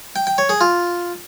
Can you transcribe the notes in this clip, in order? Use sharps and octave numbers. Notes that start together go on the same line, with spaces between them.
G5
G5
C#5
G#4
F4